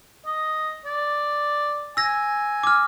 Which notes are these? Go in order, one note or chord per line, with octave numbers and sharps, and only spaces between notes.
D#5
D5
G#5 E6 A#6
D6 F6